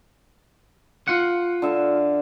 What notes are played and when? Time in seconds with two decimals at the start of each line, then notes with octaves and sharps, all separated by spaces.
1.08 F4 F#5
1.62 D3 E5 F5